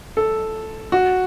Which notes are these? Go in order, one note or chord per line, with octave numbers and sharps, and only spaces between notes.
A4
F#4